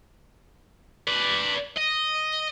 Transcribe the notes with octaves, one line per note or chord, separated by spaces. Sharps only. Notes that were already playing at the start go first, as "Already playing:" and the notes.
B4 D5
D#5